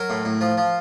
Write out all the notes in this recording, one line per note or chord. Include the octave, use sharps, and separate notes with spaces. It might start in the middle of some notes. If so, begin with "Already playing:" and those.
Already playing: F#3 A#4
A2
A2
F3
F3